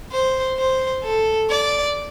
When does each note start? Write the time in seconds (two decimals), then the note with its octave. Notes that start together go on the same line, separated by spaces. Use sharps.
0.12 C5
0.58 C5
1.04 A4
1.50 D5